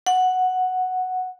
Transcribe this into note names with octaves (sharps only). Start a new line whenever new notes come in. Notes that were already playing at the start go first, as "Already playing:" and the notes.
F#5